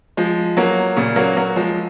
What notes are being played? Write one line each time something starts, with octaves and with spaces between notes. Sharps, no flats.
F3 G#3
F#3 A#3
A#2 C#3
F#3 A#3
F#3 A#3
F3 G#3